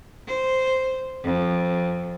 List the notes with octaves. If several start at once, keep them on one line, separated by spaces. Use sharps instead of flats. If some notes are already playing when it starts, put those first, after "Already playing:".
C5
F2